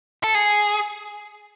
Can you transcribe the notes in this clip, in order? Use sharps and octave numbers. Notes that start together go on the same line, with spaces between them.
A4
G#4